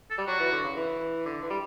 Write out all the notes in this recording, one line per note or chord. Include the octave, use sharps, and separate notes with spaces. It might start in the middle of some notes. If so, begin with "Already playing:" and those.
A4
G3
F#3 F#4
E3
D3
C#3
E3
D3
E3
G3